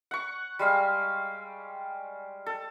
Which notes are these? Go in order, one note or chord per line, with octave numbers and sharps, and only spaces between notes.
F#5 C#6
G3 G#3 F5
A4